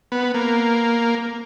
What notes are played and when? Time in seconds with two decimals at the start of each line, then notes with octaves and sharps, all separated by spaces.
0.12 B3
0.34 A#3